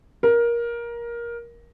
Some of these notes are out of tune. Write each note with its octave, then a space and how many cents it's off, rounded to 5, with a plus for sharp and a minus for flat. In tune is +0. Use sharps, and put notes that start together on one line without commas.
A#4 +15